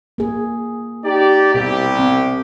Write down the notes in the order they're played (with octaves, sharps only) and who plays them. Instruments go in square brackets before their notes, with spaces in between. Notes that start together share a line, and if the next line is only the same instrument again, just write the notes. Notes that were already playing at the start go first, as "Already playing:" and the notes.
[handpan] A#3 G#4
[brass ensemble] D#4 G4 D5
[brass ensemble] C2 G4 [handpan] B2
[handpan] C4